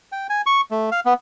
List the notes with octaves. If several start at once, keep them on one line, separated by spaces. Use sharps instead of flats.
G5
G#5
C#6
A3
F5
B3